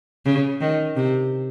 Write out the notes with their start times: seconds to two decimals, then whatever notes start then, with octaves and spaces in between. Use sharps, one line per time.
0.26 C#3
0.61 D#3
0.96 C3